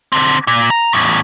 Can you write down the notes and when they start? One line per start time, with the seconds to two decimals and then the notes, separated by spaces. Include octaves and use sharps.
0.12 D3 C4
0.47 A#2
0.70 A#5
0.93 E2 A2